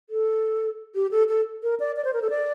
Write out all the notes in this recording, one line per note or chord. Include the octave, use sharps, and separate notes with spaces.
A4
G4
A4
A4
A#4
D5
D5
C5
A#4
A4
D5